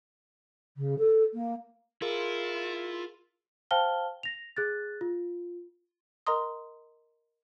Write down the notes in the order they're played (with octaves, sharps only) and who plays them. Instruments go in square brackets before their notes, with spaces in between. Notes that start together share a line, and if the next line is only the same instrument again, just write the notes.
[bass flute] C#3
A4
A#3
[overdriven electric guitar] E4 [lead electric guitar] F4 [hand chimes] G#4 A#4 C6
[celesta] C5 F5 G5 A5 F6 G7
A#6 F7
G#4 F#6 A6
F4
[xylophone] A#4 D#5 A#5 C6 D#6